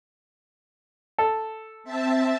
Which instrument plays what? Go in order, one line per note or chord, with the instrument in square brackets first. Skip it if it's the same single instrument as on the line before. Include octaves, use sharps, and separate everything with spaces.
[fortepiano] A4
[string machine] C4 E5 A5